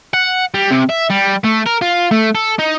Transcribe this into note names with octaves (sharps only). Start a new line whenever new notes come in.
F#5
G3
C3
E5
G3
A3
A#4
F4
A3
A4
D#4